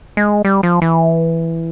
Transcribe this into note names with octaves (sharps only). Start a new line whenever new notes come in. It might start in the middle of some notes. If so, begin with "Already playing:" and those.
G#3
G3
F3
E3